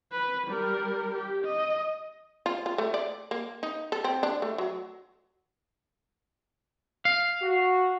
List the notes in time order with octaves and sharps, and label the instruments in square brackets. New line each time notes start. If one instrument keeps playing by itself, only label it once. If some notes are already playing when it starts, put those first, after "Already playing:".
[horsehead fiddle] B4
G3 A#4
G4
D#5
[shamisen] F4
F4
A3
D5
A#3
D#4
A4
C4
D4
A3
F#3
[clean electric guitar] F5
[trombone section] F#4